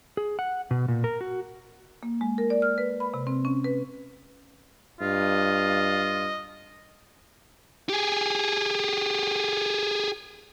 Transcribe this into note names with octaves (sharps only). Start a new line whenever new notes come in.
G#4
F#5
B2
A#2
A#4
F#4
A#3
G#3
A#4
D5
F6
B4
B5
C3
C4
C#4
B4
G2 F4 D#5
G4 G#4